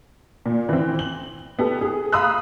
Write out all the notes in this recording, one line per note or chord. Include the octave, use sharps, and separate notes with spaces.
A#2
E3 C4
F#7
B3 G4 A4
G#4
F5 A#5 B5 D#6 E6 F#6